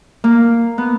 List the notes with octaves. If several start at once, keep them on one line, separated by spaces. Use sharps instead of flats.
A#3
B3